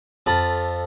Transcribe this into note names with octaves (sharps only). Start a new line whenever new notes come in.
F2 F4 A4 A#5 B5